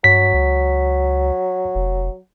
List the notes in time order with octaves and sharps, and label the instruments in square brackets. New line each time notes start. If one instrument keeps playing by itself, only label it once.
[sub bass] G2 [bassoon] F#3 [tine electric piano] B6
[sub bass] C#2
F1